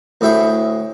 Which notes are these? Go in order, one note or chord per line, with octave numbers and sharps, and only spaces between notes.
D2 A2 E4 G#4 G5 C#6